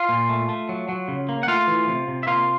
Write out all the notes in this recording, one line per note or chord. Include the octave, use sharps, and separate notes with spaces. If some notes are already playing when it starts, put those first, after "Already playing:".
Already playing: F4 F5
A#2
A3
A3
F#3
F#3
C#3
A#3
F#5
A3 F4 F5
E3
C3
C3
E5
A#3 F4 F5